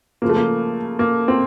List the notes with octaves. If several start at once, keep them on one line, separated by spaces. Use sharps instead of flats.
C#3 F3 A#3
A3
A#3
A#3
C4